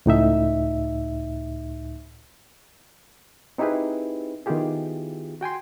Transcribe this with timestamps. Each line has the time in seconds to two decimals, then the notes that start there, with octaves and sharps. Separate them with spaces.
0.06 C#2 A2 D#4 E5
3.58 C4 D#4 E4 G4 G#4 B4
4.46 D#3 B3 E4 F4 G4 G#4
5.41 F#4 G5 G#5 C6